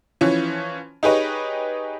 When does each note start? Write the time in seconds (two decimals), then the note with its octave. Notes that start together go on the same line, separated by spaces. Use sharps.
0.21 E3 F3 C#4
1.03 D#4 G4 G#4 B4 C#5 D#5